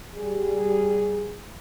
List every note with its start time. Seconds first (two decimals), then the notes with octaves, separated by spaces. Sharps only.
0.14 G3 G#4